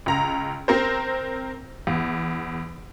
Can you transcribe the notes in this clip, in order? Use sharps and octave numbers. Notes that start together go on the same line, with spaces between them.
C#2 A#5
C4 A#4 C5
E2